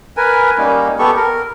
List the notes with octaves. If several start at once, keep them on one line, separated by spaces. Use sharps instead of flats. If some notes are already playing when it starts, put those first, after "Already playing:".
A#4 B4 G#5
G3 A#3 C#4 D#4
B3 G4 A4 C#6
A#4